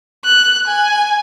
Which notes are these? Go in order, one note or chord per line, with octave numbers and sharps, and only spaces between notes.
F#6
G#5